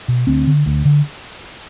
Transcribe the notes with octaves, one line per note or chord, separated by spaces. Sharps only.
B2
D2 C4
D3
D2
D3